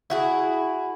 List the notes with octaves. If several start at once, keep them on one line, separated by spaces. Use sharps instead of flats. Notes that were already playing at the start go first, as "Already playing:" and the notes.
E4 F#4 G#4